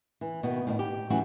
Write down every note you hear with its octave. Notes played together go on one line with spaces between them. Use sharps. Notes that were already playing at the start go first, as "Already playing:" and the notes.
E3
B2 D#3 B3
A2 D3 D#3
G4
E3 F#3 A3 C#4 F#4